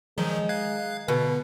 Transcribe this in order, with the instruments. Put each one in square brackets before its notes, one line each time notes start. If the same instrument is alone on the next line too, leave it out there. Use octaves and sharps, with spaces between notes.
[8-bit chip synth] D#3 F3 F#3 [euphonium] G#3 [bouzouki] D#4
[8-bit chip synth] F5 F#6 G#6
[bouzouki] B2 [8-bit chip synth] D3 [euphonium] B4